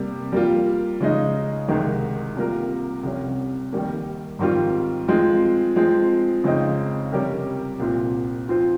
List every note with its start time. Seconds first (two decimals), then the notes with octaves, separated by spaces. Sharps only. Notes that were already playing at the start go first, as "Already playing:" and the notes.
Already playing: C3 G3 A#3
0.32 G3 A#3 F4
1.01 C#3 G#3 D#4
1.68 C2 C3 D#3 G#3
2.36 C3 G3 A#3 F4 A#4
3.03 C2 C3 G3 C#4
3.72 D#3 G3 A#3
4.39 G#2 D#3 G3 C4 F4
5.08 F3 G#3 C4 F4
5.76 F3 G#3 C4
6.44 F2 C#3 G#3 C4 D#4
7.12 C3 G3 C#4 G4 A#4
7.80 C2 A#2 F3 C4
8.48 F3 C4 F4 C5